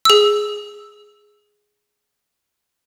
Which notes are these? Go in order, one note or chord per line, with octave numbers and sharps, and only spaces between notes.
G#4 E6